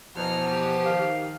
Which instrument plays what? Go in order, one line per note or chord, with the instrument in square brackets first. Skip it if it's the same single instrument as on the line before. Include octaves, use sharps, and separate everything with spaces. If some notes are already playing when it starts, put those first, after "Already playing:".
[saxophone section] E2 B2 [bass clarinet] F3 [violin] A#5 F6
[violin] G4
[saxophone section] D#3 [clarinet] F5